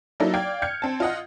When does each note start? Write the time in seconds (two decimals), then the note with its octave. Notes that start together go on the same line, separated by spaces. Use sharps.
0.20 F#3 A#3 D#4 E4 A4
0.33 D5 F5 G5 G#6
0.62 F6 G6 G#6 C#7
0.82 C4 A5
1.00 F4 D#5 F#5